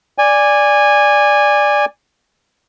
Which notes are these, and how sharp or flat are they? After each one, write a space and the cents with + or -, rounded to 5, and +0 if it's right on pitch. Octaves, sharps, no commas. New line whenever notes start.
D5 +0 G#5 -15